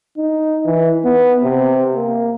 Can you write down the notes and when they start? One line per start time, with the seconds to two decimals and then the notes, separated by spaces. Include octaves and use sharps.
0.17 D#4
0.66 E3
1.05 B3
1.43 C3
1.96 A#3